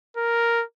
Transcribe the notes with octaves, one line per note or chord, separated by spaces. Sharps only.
A#4